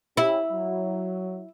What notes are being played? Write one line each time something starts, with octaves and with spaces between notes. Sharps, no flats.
C#4 E4 G4
F#3